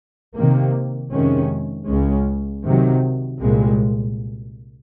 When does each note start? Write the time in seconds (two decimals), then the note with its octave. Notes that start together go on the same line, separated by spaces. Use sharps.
0.37 C3 D#3 A#3
1.12 F2 C3 D#3 G#3 C#4
1.88 C#2 C#3 G#3 C#4
2.64 C3 D#3 F#3
3.40 C2 A#2 G#3